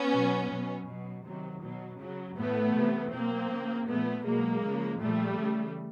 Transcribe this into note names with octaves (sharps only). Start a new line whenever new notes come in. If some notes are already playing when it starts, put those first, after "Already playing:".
Already playing: B3 C#4
B2 F#3
B2 F#3
B2 F#3
C3 D#3 F#3
B2 F#3
C#3 F#3
A2 E3 A3 B3
C3 E3
B2 F#3 A#3 C4
C#3 F3
A#2 F3 A3 B3
B2 F#3 G#3 A#3
C#3 F3
A#2 F3 G3 A3
C#3 E3